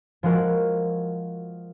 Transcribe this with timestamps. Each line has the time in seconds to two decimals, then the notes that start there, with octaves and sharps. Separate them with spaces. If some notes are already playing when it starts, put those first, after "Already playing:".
0.23 F3 G#3 F#4 A#4